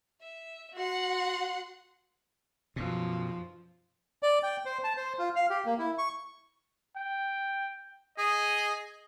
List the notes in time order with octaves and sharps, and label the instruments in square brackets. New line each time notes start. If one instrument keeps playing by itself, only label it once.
[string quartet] E5
F#4 F#5 C6
[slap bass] F#2 B2 [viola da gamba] F3
[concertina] D5
G5
C5
A5
C5
F4
F5
G4
A#3
E4
C#6
[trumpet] G5
[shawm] G#4 [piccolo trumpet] D#5